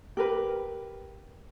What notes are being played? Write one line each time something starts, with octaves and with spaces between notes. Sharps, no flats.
G4 A#4 B4